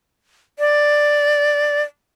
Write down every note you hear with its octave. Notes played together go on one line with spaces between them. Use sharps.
D5